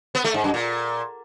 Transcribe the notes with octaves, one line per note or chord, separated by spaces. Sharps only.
B3
A3
G#2
F#2
A#2